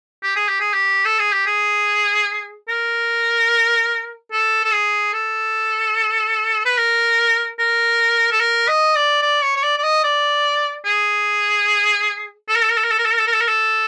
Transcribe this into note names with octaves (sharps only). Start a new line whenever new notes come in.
G4
G#4
G4
G#4
G4
A4
G#4
G4
G#4
A#4
A4
A4
G#4
A4
B4
A#4
A#4
A4
A#4
D#5
D5
D5
C#5
C#5
D5
D5
D#5
D5
G#4
A4
A#4
A4
A#4
A4
A#4
A4
A#4
A4
A#4
A4
A#4
A4
A#4
A4